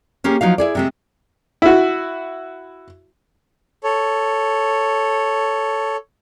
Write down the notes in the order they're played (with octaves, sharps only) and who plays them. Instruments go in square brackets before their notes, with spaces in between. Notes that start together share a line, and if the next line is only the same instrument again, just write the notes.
[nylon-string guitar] A#3 C#4 G4 G#4
F3 F#3 D#4 F5
E4 G#4 D5
C3 G#3 A3
[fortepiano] E4 F#4
[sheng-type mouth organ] A4 C#5